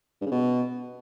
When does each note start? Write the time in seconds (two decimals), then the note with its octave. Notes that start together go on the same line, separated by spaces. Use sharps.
0.21 G2
0.26 C#3
0.31 B2